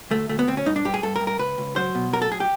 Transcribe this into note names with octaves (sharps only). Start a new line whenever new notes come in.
D2 A3
D2 A3
B3
D2 C4
C#4
G2 D#4
D4
G2 G4
G#4
G2 A4
A#4
G2
A#4
C#2 B4
C#2
F#3 C5
B2
F#3 A#4
A4
G#4
G4